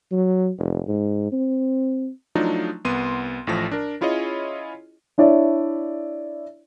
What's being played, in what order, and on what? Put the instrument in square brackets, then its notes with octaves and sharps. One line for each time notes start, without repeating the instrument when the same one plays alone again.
[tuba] F#3
F1
G#2
C4
[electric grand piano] F3 F#3 A3 D4 D#4 F4
C2 B3 C6 D#7
A1 A2 F3 A#6
D4 A#4
C#4 E4 F4 G#4 C#5 D#5
[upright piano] D4 E4 C#5 D5 E5